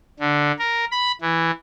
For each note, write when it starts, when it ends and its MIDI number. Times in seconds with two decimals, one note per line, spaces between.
0.20 0.52 50
0.59 0.85 70
0.91 1.12 83
1.21 1.51 52